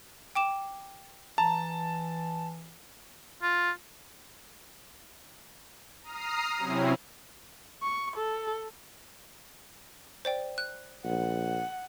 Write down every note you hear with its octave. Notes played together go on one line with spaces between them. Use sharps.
G5 D6 E7
E3 A5 A#5
F4
A#5 D#6 F6 C7
C3 F#3 C4 C#4 E4
C#6
A4
C5 D5 G5
F#6
A#1 F#5